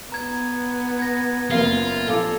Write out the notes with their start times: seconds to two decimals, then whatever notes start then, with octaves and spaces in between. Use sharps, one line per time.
0.12 B3 A#5 G#6
0.99 G#6 A#6
1.51 F#1 A#3 F4 F5 C7
2.07 A#1 A4 F5 D6